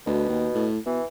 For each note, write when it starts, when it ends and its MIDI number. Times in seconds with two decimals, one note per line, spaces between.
0.06 0.25 38
0.06 0.67 47
0.29 0.49 39
0.55 0.78 45
0.86 0.99 47
0.86 1.05 52